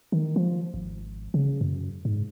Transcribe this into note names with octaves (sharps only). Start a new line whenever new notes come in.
D#3
F3
G#1
C#3
F#2
G#2